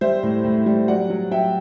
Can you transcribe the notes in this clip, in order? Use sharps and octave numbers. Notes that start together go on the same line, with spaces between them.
G3 C5 E5
A2
A2
G3
F#3 D5 F#5
F#3
F#3 E5 G5